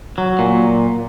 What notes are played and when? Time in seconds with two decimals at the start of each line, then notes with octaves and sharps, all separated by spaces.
0.18 F#3
0.39 A#2